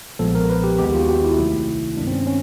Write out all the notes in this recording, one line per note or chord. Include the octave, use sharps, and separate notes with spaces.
B1 A#2 F3 G#3 B3 A4
A#4
B4
G4
D#2 D#3 G#3 B3 G4
G4
F4
F#4
G4
E4
C2 C3 D#3 F#3 A3
G2 D#3 G#3 B3 D4
C4
C#4
C#4